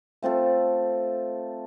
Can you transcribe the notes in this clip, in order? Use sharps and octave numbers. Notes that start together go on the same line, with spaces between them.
A3 C4 F4 A4